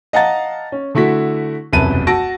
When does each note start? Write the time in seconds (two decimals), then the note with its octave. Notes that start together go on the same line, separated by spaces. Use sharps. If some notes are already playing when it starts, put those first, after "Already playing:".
0.13 D#5 F5 F#5 A5 A#5 A6
0.72 C#4
0.95 D3 A3 E4 F#4 B6
1.73 E1 C2 F#2 B4 A5 D#7
2.07 F#4 A5 E6 A#6 D7